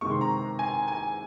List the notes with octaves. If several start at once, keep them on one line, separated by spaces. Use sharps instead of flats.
C3 D#3 G#3 C#6
C6
A#5
G#5
G#5